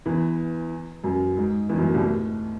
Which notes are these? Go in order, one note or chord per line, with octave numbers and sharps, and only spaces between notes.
E2 E3
F#2 F#3
G#2 G#3
E2 E3
F#2 F#3
A2 A3
C2 C3
A2